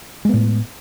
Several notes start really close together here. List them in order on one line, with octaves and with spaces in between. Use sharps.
G#3 B3 A2